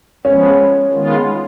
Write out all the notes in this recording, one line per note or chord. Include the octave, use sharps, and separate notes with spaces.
F3 G#3 B3 C#4
D#3 G#3 B3 F4